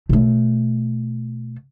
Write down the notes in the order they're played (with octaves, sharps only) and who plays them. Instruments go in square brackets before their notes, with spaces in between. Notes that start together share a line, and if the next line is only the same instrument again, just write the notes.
[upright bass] B2 A3